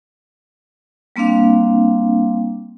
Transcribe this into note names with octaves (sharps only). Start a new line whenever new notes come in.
G3 A#3 C4 D4 F5